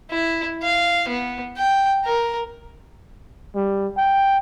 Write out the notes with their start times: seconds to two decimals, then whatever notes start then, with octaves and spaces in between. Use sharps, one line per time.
0.11 E4
0.63 F5
1.08 B3
1.57 G5
2.05 A#4
3.55 G3
3.97 G5